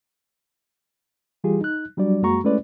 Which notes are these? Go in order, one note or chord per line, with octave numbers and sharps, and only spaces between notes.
E3 G3 F4 G4 G#4
D#4 F#6
F#3 G3 D4 F#4 D5
F#2 G#3 A#3 F#4 A#5 C#6
G#3 A3 C#4 E4 B4 D5